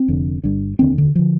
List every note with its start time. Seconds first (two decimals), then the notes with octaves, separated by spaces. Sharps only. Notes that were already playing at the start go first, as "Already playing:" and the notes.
Already playing: C4
0.08 F1 F2 D3
0.44 G1 G2 D3
0.79 F1 D#2 D3 C4
0.98 D3
1.15 D3 F3